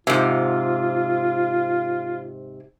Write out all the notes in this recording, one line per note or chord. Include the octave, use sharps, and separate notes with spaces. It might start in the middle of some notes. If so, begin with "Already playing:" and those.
G#2 C3 F4